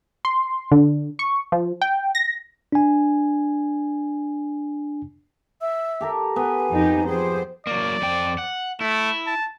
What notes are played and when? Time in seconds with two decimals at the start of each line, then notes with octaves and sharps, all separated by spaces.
0.25 C6
0.72 D3
1.19 C#6
1.52 F3
1.81 G5
2.15 A#6
2.72 D4 G#5
5.61 E5 E6
6.01 G4 A4 A#4
6.36 B3 G#5
6.70 F2 D#4 G4
7.08 F3 G4 G#4 C5 G5
7.67 F#3 A#3 D5
8.02 F2 G5
8.38 F#5
8.81 A3 E4
9.27 A5